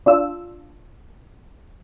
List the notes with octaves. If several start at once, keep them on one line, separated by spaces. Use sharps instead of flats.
D4 F4 E6